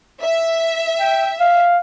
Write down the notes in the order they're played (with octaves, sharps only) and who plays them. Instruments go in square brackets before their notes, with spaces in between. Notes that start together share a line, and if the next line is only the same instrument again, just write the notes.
[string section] E5
[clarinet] G5
F5